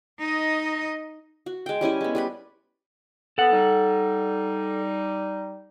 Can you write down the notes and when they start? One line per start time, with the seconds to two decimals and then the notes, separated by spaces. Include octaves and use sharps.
0.19 D#4 D#5
1.46 F#4
1.66 G#3 G5
1.81 G3 C#4 E4 G#5
2.01 G#3 B3
2.15 G3 B4 B5
3.38 B3 A4 F#5
3.51 G3 D#4